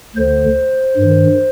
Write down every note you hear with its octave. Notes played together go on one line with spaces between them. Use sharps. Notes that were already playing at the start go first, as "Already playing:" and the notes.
D2 D3 C5
G2 D#3